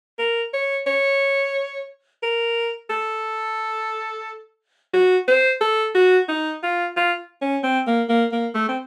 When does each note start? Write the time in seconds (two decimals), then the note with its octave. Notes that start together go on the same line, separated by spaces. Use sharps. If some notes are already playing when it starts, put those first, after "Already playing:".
0.19 A#4
0.53 C#5
0.87 C#5
2.23 A#4
2.90 A4
4.93 F#4
5.28 C5
5.61 A4
5.95 F#4
6.29 D#4
6.63 F4
6.96 F4
7.41 C#4
7.63 C4
7.87 A#3
8.09 A#3
8.32 A#3
8.55 A3
8.69 C4